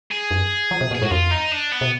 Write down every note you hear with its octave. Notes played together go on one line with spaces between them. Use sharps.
G#4
F#2
F3
B2
A#2
G#4
G#2 F#4
F2 F4
D#4
D4
B3
B2